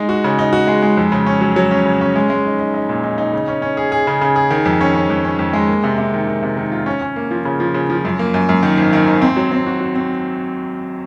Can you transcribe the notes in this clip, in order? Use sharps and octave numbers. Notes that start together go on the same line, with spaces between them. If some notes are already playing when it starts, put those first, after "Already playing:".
Already playing: G#3 D#4
F#4
C#3
D#4
F#4
G#3
G#3
F2
C#3
C#4
F#3
F#3
C#4
C#3
C#4
G#3
G#3
D#4
D#4
D#4
A#2
D#4
D#4
C#3
C#4
C#4
G#4
G#4
C#3
C#3
G#4
D#3
F2
C#4
C#4
F2
C#4
F2
G#3
A#3
C3
C3
D#3
D#3
C3
D#3
F4
C#4
C#4
A#3
F3
C#3
F3
C#3
F3
F#2
A#3
F#2
F#2
D#3
G#1
D#3
G#1
C4
F#3
C4
F#4
F#4
C4